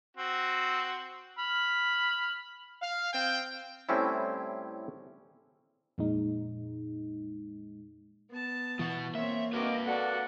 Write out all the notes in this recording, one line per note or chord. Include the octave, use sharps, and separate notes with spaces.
C4 F#4
B5 F6
F5
C4 F5 G5
A2 G3 C4 C#4 E4
F2 A#2 G#3 D#4
B3 A5
B2 E3 F#4
A#3 C4 C#5 E5
F2 F#4 A#4 B4 D#5 F5 D6
F#4 A4 D5 F#5